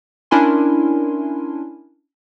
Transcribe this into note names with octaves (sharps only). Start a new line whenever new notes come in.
C#4 D4 E4 A#4 G#5 C6